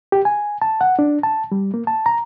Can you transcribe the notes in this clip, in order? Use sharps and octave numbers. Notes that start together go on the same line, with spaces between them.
G4
G#5
A5
F#5
D4
A5
G3
A#3
A5
A#5